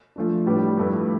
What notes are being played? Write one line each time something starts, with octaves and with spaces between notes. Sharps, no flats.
F3 A3 D4
A2 G3 B3 D4 G4
G2 F3 A3 E4 B4